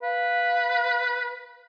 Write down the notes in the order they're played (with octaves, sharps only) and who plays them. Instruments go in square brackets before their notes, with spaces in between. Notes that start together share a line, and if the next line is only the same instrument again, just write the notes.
[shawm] B4 [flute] F5